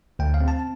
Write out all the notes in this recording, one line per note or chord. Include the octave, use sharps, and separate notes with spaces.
D2 G5
F5
C4
A5